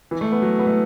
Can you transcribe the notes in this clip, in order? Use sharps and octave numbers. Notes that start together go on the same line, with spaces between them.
E3
A3
B3
F#3
B3
A3